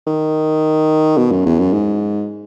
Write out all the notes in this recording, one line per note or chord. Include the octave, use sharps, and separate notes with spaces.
D#3
B2
F#2
E2
F#2
G#2